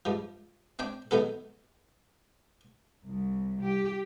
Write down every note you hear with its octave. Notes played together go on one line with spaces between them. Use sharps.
G2 F3
C4 D4 G5
D#3 F#3 B3 A4
C2
G4